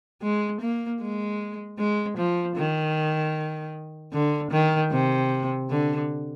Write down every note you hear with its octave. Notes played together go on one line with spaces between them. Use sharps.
G#3
A#3
G#3
G#3
F3
D#3
D3
D#3
C3
D3